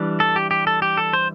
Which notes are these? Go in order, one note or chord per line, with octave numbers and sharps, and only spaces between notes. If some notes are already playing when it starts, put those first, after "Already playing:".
Already playing: E3 G3 D4
A4
G4
G4
A4
G4
A4
C5